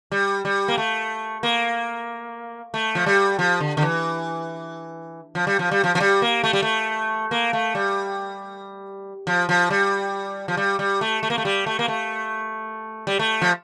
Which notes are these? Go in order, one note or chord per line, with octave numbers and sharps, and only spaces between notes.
G3
G3
A#3
A3
A#3
A3
F3
G3
F3
D3
D3
E3
F3
G3
F3
G3
F3
F3
G3
A#3
A3
G3
A3
A#3
A3
G3
F3
F3
G3
F3
G3
G3
A3
A3
A#3
A3
G3
A3
A#3
A3
G3
A3
F3